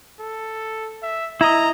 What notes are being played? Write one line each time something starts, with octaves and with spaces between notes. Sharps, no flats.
A4
E5
E4 D#5 A#5